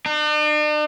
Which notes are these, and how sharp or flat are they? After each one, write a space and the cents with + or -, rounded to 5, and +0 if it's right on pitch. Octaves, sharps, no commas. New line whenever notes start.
D4 +45